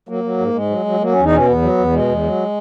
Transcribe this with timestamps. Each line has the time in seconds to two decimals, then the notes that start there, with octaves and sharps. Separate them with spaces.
0.09 F#3 A#3
0.24 F#3
0.38 G#2
0.54 G#2 G#3
0.70 F#3
0.85 F#3
1.00 F#3 A#3
1.12 E2 C#4
1.24 D#4
1.32 B2 C#4
1.46 E2 B3
1.62 F#3
1.78 E2
1.92 B2 G#3
2.07 E2
2.23 F#3